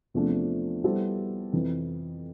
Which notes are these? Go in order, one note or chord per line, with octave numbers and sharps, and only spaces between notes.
E2 C3 F3 A3 D4
G3 B3 E4 A4 C5
F2 C3 E3